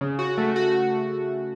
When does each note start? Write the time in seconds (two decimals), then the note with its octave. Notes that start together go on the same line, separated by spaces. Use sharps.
0.01 C#3
0.19 F#4
0.38 A3
0.56 F#4